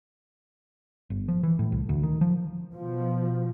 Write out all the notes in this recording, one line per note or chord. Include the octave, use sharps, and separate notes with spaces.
G1
F3
E3
A2
C2
D2
D#3
F3
B2 F3